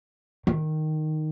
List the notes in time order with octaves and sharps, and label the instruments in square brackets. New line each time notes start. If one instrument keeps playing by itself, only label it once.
[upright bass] D#3